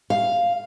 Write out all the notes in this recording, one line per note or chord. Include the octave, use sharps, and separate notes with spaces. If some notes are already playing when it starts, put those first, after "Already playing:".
F5